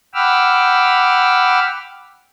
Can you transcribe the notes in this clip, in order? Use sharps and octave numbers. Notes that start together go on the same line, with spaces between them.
F#5 G5 B5 D6 E6 F6